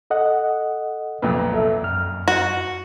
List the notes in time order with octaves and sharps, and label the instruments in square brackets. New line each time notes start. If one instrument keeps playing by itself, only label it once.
[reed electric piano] A4 D#5 F#5
[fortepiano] B1 F2 A#2 [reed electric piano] B4
[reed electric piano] C2 A4 E5
F#2 F6
[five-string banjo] F#4